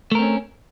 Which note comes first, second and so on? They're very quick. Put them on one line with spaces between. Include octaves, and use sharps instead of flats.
A3 A#4 C4 C#4